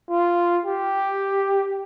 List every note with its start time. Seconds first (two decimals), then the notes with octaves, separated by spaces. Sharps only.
0.10 F4
0.66 G4